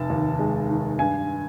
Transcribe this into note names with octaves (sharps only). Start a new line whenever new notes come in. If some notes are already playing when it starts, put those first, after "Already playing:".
Already playing: F1 A5
D#2
G#3
D#3
G2 G#5